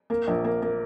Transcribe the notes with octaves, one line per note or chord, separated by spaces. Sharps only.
A#3
A#1
A#3
A#3